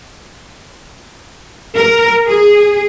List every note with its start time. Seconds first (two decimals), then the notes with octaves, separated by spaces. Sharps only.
1.76 A#4
2.28 G#4